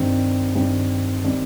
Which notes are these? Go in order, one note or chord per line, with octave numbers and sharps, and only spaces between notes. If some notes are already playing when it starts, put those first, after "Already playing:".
Already playing: G2 D#3 G3 C4
G2 D#3 G3 C4
D#3 G3 C4